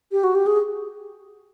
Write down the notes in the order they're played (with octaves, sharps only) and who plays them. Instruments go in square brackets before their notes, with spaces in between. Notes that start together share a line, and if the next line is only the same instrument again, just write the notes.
[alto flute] G4
F#4
G4
G#4